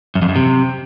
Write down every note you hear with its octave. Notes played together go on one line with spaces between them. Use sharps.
F#2
F2
F#2
C3